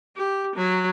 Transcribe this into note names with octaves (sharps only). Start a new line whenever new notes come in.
G4
F#3